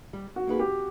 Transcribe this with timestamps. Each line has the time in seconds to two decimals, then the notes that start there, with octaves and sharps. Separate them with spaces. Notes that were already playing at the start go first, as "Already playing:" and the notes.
0.13 G3
0.36 F#4
0.47 A#3 D#4 G#4 B4
0.59 G4